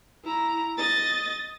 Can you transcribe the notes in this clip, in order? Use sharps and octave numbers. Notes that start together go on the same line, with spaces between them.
E4 A#5
D#5 A6